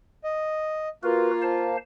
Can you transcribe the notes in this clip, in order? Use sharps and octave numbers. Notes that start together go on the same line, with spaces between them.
D#5
A#3 F4 F#4 A#4 B4
C5 F5 A5